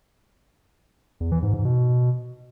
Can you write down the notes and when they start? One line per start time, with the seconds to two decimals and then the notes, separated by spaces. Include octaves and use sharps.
1.20 E2
1.31 E3
1.43 G#2
1.54 G#2
1.65 B2